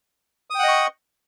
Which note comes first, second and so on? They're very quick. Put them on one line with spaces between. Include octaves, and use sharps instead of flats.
D#6 G5 F#5 D#5 C#6